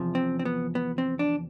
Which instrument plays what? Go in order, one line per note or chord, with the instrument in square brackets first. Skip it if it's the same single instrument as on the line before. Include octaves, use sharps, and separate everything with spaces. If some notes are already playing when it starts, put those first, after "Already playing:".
Already playing: [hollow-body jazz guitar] E2 C3 F3
C4
C4
B3
B3
C4
D4